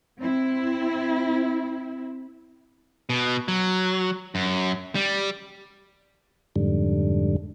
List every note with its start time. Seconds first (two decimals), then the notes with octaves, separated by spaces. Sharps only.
0.20 C4 E4
3.09 B2
3.48 F#3
4.35 F#2
4.95 G3
6.56 F2 G#2 D3 G3